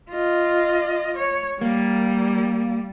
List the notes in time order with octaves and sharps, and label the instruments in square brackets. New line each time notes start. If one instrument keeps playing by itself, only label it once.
[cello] F4 D#5
C#5
[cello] G3 [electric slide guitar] A#3